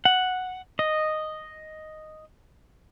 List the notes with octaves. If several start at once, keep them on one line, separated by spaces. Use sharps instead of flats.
F#5
D#5